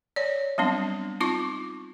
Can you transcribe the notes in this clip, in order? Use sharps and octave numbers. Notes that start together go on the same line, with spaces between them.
C#5 D5
F#3 G3 B3 C4 D4
C4 D#4 F4 C#6 D6